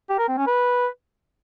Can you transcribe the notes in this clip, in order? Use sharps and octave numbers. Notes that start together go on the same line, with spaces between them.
G4
A#4
C4
C#4
B4